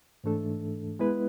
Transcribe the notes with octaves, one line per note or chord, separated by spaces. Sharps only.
G#2 E3 A3 D4 A4
G#3 B3 E4 B4